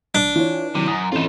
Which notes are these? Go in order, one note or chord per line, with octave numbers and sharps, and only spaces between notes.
A1 D4
E3 F4 C#5
C3 D#3 F#3
F#2 A#5 D#6
A2 E3 C4 C#4 D#4 F4 E7